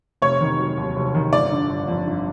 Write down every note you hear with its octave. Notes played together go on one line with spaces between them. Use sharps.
F1 C#5
D#3
F#3
D#2
F1
D#3
G1 D5
D3
G1
F2
G1